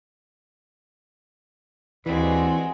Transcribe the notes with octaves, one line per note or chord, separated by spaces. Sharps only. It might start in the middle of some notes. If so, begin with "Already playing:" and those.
D#2 E3 G#3 C4 F#4 B4 D5